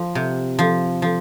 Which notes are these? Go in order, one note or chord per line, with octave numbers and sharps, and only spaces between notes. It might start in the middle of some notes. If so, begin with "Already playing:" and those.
Already playing: F3
C3
F3
F3